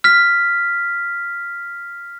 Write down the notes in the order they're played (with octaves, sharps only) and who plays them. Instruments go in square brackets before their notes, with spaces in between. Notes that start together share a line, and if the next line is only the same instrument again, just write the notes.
[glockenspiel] F6 B6